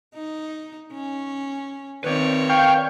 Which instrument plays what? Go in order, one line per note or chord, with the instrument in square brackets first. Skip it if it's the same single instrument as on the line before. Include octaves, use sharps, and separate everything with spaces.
[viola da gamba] D#4
C#4
[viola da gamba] D#3 C4 C#5 [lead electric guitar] B4 D5
[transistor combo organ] F5 G5 C#6